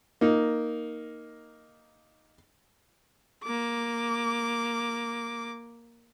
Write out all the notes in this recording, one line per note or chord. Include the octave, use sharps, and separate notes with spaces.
A#3 D#4
A#3 D6